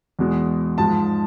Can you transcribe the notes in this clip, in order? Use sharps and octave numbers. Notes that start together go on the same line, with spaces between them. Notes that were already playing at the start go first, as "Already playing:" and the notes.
E2 B2 G#3
G#2 F3 G#3 A5